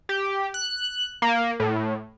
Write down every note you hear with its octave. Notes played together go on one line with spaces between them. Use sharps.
G4
F#6
A#3
A2